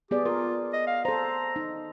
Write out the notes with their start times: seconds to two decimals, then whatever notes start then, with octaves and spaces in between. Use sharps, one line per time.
0.11 B3 G4 G#4 D5
0.25 F4 A#4
0.73 D#5
0.87 F5
1.05 A4 C5 A#5
1.56 D#4